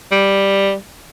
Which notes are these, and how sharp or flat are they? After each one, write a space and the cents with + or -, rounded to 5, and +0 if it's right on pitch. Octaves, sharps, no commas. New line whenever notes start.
G3 +5